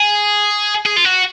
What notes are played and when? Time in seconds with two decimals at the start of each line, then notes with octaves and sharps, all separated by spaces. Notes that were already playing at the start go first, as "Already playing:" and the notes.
Already playing: G#4
0.86 G#4
0.96 F4
1.05 F#4